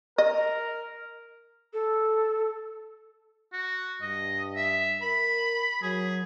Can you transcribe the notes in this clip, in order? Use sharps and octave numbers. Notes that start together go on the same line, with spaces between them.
A#4 D#5
A4
F#4
G2 D#5
E5
A#4 B5
F#3 G#4